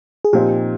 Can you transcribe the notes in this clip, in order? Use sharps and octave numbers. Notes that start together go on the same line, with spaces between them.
G#4
A#2 F3 C4 D#4 G4